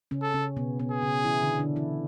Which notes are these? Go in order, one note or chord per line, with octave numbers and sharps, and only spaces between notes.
C#3 C#4
A4
C#3 C#4
B2 B3
B2 B3
G#4
C#3 C#4
E3 E4
D3 D4
D3 D4
E3 E4